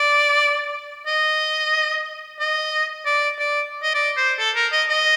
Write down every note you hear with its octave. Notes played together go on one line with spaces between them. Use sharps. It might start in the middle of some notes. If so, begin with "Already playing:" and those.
Already playing: D5
D#5
D#5
D5
D5
D#5
D5
C5
A4
A#4
D#5
D#5